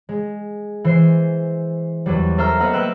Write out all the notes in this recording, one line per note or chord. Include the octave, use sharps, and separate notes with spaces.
G#3
E3 C5 C7
E2 F#3 G3
A4 A#4 C5 E5 A#5 F6
A#3 B3 A#4 D#5 E5 F#5
A#3 B4 G5 E6 F#6 E7